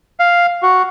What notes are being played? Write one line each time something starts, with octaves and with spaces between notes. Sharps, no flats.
F5
F#4